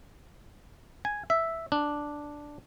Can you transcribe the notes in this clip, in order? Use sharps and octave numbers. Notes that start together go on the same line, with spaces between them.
G#5
E5
D4